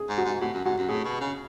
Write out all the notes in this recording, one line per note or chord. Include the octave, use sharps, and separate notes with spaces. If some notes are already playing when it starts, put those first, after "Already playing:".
Already playing: G#4
G#2
F#4
G#2
A2 F#4
F#2
G#2 F#4
F#2
A2 G#4
B2
C#3